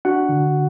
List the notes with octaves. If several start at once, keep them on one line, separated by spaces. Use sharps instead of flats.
D4 F#4 F#5
D3